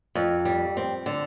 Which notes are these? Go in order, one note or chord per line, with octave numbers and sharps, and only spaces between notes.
F2
G3
C4
D3